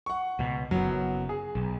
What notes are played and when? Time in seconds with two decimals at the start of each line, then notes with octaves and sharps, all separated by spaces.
0.06 F#5 C#6
0.39 C#2 B2
0.71 F#1 F#2 F#3 B3
1.29 G#4
1.55 B1